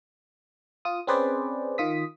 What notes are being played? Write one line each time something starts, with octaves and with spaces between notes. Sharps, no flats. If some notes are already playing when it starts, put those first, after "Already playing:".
F4 D#6
C4 C#4 G#4 B4 C5 D5
D#3 F4 D#6 B6